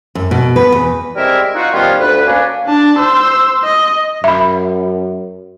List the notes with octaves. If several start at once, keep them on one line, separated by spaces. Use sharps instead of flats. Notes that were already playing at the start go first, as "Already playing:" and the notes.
F#2
B2
B4
E2
G3 G#3 C4 E4 A#4 E5
D#4 F4 F#4
D#3 F3 G3 B3 C#4 F4
D2 B4
A#3 C#4 D4
D4 A5
C5 E6
D#5
F#2 E5 B5